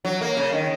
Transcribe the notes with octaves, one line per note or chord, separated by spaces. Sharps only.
F#3
A#3
C#3
D#3